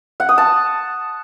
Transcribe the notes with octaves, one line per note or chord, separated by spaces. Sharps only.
F#5
D#6
A5